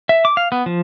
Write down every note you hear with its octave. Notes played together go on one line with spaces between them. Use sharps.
E5
D6
F5
B3
F3